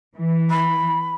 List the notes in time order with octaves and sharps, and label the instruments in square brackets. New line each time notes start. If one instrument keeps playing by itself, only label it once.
[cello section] E3
[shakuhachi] B5